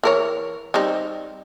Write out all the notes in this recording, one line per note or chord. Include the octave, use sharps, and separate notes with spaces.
E3 A#4 C#5
G3 C4 D#4